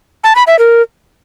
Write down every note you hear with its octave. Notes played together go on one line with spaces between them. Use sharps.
A5
B5
E5
A#4